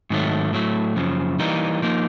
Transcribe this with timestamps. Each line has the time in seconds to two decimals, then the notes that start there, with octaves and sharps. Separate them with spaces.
0.10 G#2 D#3 F#3 A3
0.53 A2 F#3 A3
0.96 F#2 C#3 F3
1.39 E3 G3 A#3 D#4
1.82 F3 A#3 D#4